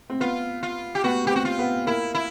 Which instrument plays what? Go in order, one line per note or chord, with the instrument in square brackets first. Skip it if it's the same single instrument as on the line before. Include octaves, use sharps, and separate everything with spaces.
[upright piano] C4
[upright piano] B3 [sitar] F4
[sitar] F4
G4
[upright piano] B3 [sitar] F#4
[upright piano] B3 [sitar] G4
[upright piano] C4 [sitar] F#4
[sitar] F4
[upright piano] B3
[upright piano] A#3 [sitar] E4
[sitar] E4